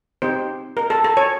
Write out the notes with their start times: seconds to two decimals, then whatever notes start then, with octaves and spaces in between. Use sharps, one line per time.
0.22 C4 D#4 G4 C5
0.77 A#4
0.90 A4
1.04 A4
1.17 C#5